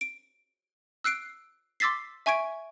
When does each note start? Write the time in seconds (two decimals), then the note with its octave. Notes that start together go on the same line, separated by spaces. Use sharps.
0.01 D7
1.04 E6 F#6 C7 D7
1.80 C6 D6 E6 A6 B6 C7
2.26 E5 G#5 C#6 G#6 D7